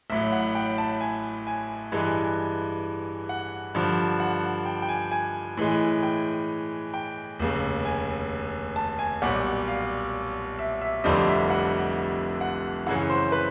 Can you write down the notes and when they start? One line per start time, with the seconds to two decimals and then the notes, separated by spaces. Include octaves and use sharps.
0.10 A1 A2 F#3 E5
0.33 F#5
0.55 G5
0.78 A5
1.01 G#5
1.47 G#5
1.92 G2 E3 G#3
3.29 F#5
3.75 G2 D3 F3
4.20 F#5
4.66 G5
4.82 G5
4.89 G#5
5.12 G#5
5.57 A2 E3 G#3
6.03 G5
6.94 G5
7.39 F1 D#2 C#3
7.85 G#5
8.76 A5
8.99 G#5
9.22 B1 A#2 G3 F#5
9.68 F5
10.59 E5
10.82 E5
11.04 F1 F2 D3 G3 C4 D#5
11.27 E5
11.50 F#5
12.41 F#5
12.86 F#2 C#3 E3 F#5
13.10 C5
13.32 B4